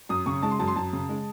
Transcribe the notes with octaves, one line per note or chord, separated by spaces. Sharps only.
F#2 D#6
C#3 C#6
G#3 A5
C6
F#2 A5
C6
F#2 A5
C#3
G#3